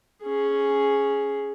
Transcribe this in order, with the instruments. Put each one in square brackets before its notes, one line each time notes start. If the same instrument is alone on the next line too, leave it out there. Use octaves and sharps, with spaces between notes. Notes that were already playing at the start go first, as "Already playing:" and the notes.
[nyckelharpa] C#4 G#4